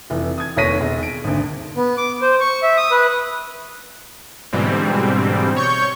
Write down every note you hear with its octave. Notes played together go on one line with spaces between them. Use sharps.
F1 E3
D#6 G#6
F1 D#2 C#5 A#6 B6 D#7
E1
D7
G#1 D2
B3
D6
C5
C#6
E5
D#6
B4
G#2 B2 D3 E3 G3 C4
C#5 C#6 G6